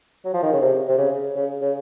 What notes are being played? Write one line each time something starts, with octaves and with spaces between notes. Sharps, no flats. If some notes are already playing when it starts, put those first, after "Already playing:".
F#3
F3
D#3
C#3
C3
C3
C#3
C#3
C#3